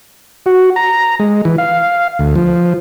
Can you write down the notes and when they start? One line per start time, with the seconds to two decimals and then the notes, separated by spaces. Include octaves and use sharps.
0.46 F#4
0.76 A#5
1.20 G#3
1.45 E3
1.58 F5
2.19 D2
2.35 F3